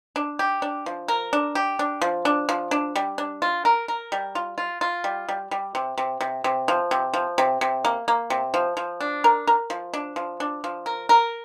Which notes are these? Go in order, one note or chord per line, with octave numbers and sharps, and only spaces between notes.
D4
G4
D4
F3
A#4
D4
G4
D4
F3
D4
F3
D4
G3
D4
F4
A#4
A#4
G3
F4
F4
F4
G3
G3
G3
C3
C3
C3
C3
F3
C3
F3
C3
C3
A#3
A#3
C3
F3
F3
D4
A#4
A#4
F3
D4
F3
D4
F3
A#4
A#4